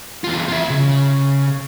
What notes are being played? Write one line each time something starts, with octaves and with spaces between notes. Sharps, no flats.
E2 F4
F4 E5
C#3